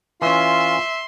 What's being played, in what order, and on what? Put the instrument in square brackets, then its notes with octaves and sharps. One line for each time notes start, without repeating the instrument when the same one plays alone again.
[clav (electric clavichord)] E3 C#4 [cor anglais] F4 [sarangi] E5 [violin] C6